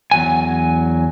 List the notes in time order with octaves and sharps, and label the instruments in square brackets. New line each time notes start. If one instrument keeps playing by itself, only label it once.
[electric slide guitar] E2 F#3 G#5